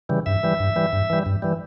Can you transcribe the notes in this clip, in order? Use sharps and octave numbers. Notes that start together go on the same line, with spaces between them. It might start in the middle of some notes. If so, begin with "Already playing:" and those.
C#3 E3 G3
G2 E5
E3 G3
G2
E3 G3
G2
E3 G3
G2
E3 G3